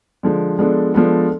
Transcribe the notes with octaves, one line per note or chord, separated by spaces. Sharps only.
D3 F3 G#3
F3 G#3 B3 D4 A4
F3 G#3 B3 D4 A4